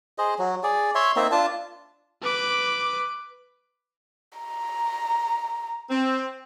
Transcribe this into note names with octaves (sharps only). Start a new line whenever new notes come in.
G#4 C5 D#5
F#3
G#4 D5
C#5 E5 C6
A#3 C4 D#4 E5
D4 F4 A5
B4 D6
A#5
C4